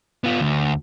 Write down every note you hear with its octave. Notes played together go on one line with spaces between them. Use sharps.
B3 F4
D2